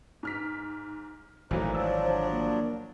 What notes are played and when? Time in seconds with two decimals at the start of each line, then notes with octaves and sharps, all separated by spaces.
0.23 G#2 F6 B6
1.51 G#1 A#2 E3 F#3 A3 D#4 B4 C5
1.75 F3 F#3 D4 E6
2.31 A#3